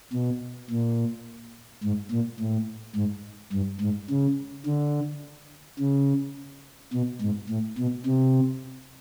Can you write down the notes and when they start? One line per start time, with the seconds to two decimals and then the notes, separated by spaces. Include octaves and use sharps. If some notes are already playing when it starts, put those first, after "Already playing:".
0.13 B2
0.71 A#2
1.84 G#2
2.11 A#2
2.40 A2
2.96 G#2
3.53 G2
3.81 G#2
4.10 C#3
4.66 D3
5.79 C#3
6.93 B2
7.21 G#2
7.50 A2
7.78 B2
8.06 C3